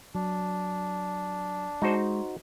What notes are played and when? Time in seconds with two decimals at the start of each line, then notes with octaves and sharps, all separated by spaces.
0.14 F#3 D4
1.82 G#3 D#4 F#4 C5